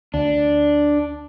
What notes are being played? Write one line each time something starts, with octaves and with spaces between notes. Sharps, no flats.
D2 D4